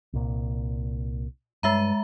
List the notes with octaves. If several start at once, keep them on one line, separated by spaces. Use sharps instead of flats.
C2 A#2
G2 G#3 E5 A#5